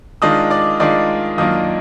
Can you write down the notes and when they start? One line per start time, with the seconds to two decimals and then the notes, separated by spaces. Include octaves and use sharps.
0.22 D#3 G#3 D4 F4 D#5 D#6
0.50 D5 D6
0.80 D#3 G#3 D4 F4 D5 D6
1.38 F#2 D#3 A#3 D4 F4 D#5 D#6